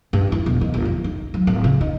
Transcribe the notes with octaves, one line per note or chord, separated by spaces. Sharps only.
G2
E4
E1
D#3
G1
F2
D#4
F#3
D1
C#3
D#4